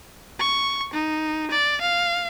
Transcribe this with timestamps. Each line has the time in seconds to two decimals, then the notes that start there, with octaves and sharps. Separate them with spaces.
0.40 C#6
0.93 D#4
1.51 D5
1.81 F5